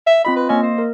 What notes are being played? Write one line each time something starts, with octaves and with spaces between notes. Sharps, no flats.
E5
C4 F4 D#5 B5
B4
A#3 C#4 D#5
C5
A#4